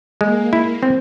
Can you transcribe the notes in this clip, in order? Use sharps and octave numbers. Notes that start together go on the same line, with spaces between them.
G#3 A#3
E4
C4